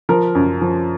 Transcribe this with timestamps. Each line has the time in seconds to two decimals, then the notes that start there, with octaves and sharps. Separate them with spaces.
0.09 F3 A#4
0.35 F#2
0.61 F3